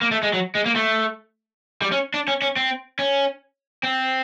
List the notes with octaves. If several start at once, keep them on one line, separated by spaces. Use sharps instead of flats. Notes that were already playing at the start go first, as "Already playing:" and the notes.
A#3
A3
G#3
F#3
G#3
A#3
A3
G3
C#4
D4
C#4
C#4
C4
C#4
C4